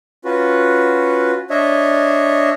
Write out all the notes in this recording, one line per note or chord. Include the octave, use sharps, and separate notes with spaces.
C#4 F4 F#4 B4
D4 C#5 D#5 E5